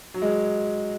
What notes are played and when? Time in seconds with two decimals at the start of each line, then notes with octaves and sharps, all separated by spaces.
0.14 F#3
0.22 G#3